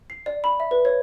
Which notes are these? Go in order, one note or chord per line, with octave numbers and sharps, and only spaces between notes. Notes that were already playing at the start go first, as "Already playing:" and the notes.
C7
D5
B5
E5
B4
C#5